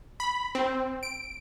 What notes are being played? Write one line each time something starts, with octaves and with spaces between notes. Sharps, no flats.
B5
C4
D7